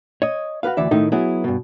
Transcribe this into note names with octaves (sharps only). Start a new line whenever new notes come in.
C#5 D#5
F#4 G#4 B4 F5
D2 E3 D5 E5
A2 D#3 A3 D#4 E4
F#3 B3 E4 G#4
G2 B2